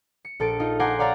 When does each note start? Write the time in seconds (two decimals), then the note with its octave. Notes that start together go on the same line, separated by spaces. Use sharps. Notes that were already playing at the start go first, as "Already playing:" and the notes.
0.25 C#7
0.40 A#1 A4 A6 D7
0.60 D#4 F4
0.80 F#5 G#5 A#5 C6 D6 G6
0.99 C#5 D5 F5 A#5 A6 A#6